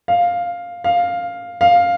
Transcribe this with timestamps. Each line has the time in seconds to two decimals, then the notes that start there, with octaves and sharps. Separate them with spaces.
0.08 F5
0.84 F5
1.61 F5